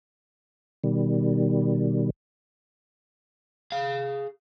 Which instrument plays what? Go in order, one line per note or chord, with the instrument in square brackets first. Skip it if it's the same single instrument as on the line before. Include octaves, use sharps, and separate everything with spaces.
[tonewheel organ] B2 D#3 G3
[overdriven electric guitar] G#4 F5